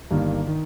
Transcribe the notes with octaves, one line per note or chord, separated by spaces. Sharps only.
G1 G2 D#3 A#3
D#3